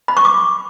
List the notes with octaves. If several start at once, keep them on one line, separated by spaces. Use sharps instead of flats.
B5
C#6
D6